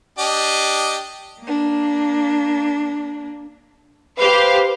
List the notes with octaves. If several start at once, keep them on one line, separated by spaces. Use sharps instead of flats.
D4 G4 D#5
A#3 D4
G4 B4 C5 F5